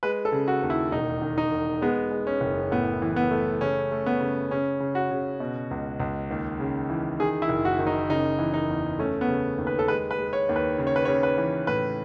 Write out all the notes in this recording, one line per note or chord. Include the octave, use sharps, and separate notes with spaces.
G#3 B4
A4
C#3
F#4
D#2
E4
E1 D#4
D#3
D#4
E1
G#3 B3
G#3
C#4
F#1
A2 B3
E3
B3
A3
C#3 C#4
A3
B3
C#3
C#3 C#4
C#3
F#4
C#3
B2
C#2
C#2
D#2
C#3
E3
D#3 G#4
E4
F#1
F#4
D#3
D#4
C#3 D#4
E3
D#4
E2
A3 C#4
B3
C#3
D#2
B4
A4
G#3 B4
B4
G#3
C#5
D#2
B4
C#3
C#5
B4
C#3 C#5
B4
E3
A2 B4